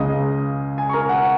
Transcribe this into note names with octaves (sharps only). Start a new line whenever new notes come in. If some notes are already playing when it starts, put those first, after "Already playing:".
Already playing: C#2 C#3 G#3 D#5 D#6
G#5
C#6
A#4 A#5
F#5